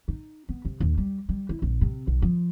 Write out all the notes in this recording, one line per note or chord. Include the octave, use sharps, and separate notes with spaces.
D#4
B3
C3
D#2
G3
G3
E4
A#1
C3
B1
F3